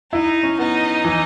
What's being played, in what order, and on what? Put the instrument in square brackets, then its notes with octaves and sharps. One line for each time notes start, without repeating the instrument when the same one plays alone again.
[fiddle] D#4 [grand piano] E4
[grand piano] C#4
[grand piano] B3 [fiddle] D#4
[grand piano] E3